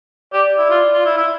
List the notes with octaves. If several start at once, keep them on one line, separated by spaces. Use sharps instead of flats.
G4 D5
E4
F4
F4
E4
E4